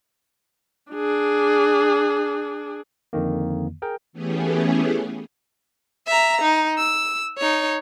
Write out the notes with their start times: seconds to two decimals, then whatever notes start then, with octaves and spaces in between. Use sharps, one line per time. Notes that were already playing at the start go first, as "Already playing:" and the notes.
0.91 D4 G#4
3.13 F2 D3 D#3 A#3
3.82 G#4 A#4 G5
4.13 E3 A3 B3 C#4 G4 G#4
6.07 E5 A#5
6.42 D#4
6.78 E6
7.38 D#4 C#5